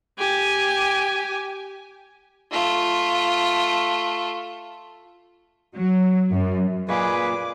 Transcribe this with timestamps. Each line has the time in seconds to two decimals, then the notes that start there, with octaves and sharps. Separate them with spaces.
0.18 G4 G#5
2.52 A3 F4
5.76 F#3
6.32 F#2
6.89 A#2 G#4 B4 D#5 F5 G#5 D6